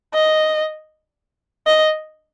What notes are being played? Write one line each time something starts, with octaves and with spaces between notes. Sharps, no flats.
D#5
D#5